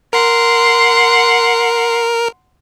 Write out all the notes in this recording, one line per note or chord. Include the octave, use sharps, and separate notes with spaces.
A#4 F#5 C6